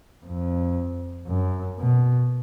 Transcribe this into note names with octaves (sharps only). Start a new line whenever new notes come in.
F2
F#2
B2